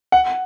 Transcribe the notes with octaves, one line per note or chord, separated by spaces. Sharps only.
F#5